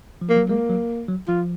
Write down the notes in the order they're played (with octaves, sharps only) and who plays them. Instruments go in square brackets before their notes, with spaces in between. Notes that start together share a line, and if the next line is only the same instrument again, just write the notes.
[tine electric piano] F3
[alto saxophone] A#3
[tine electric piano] F#3
[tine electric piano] G#3 [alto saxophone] A#3
[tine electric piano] F#3
F#3
[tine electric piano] F3 [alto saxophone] F4